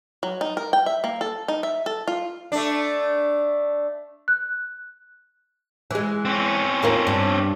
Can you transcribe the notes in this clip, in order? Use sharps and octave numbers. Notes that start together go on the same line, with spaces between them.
F#3
D#4
A#4
G5
E5
A#3
A4
D#4
E5
A4
F4
A3 D4
F#6
E3 G#3
C4 C#4
D#2 A#3 F4
G2